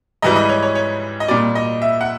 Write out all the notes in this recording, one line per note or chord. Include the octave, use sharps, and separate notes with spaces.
G#2 E3 G3 D#5
D#5
C#5
C#5
C#5
D#5
A#2 G3 D5
D#5
E5
F#5